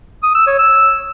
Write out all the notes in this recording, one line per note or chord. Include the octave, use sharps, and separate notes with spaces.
D#6
E6
C#5
E6